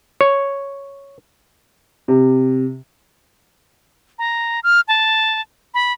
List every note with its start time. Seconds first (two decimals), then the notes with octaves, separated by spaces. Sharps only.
0.21 C#5
2.08 C3
4.19 A#5
4.63 F6
4.88 A5
5.74 B5